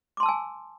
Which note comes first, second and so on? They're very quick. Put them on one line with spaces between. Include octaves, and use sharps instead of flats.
D6 C6 A5 E6 G#5